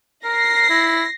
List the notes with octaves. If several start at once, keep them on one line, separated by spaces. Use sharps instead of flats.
A#4 A#6 C7
E4